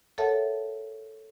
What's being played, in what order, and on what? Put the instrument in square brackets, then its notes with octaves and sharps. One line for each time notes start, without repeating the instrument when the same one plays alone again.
[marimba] A4 A#4 C#5 E5 F#5 A5